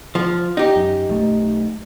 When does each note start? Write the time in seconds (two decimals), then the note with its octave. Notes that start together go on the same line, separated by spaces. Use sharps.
0.15 F3
0.57 D#4 G4
0.76 F#2
1.09 B1 A3